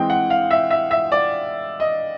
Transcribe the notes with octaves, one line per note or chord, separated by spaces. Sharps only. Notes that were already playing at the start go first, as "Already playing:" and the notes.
Already playing: E3 G#3 C4 G5
F#5
F5
E5
E5
E5
D5
D#5